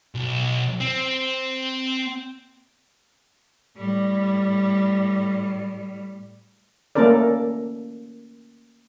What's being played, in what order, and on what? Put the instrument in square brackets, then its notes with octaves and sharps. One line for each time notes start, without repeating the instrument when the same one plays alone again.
[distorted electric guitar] B1
C4
[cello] A2 G3
[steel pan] A3 A#3 C#4 A4 A#4 D5